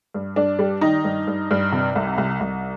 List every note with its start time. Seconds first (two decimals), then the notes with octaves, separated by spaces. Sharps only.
0.14 G2
0.36 G2 D4
0.59 G3
0.81 D#3 D#4
1.04 G2
1.27 G2
1.51 G2
1.73 C3
1.95 C2
2.18 C2
2.40 C2